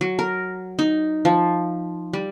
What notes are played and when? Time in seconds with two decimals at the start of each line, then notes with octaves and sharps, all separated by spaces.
0.01 F#3
0.19 A#4
0.79 D#4
1.25 F3
2.13 G3